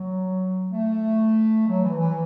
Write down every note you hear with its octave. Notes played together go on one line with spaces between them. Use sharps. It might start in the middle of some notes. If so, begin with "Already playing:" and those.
Already playing: F#3
A3
F#3
E3
E3